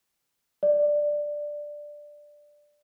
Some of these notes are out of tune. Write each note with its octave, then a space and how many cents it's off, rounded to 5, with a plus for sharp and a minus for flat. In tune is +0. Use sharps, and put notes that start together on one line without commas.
D5 +5